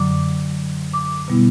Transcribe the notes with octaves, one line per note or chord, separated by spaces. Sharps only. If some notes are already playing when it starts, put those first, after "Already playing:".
Already playing: F#2 D3 F#3 D6
D6
B2 G3 B3 E4